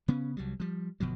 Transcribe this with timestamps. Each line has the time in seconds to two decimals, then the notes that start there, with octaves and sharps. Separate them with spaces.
0.08 C#3 B3 C#4
0.37 C2 F#3 G3
0.60 F3 G3
1.00 G1 B2 F3 F#3